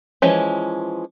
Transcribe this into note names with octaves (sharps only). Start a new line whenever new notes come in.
E3 F3 G#3 C#4